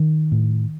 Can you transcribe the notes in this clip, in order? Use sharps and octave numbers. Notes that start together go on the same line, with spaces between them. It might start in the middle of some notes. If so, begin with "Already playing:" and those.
Already playing: D#3
A2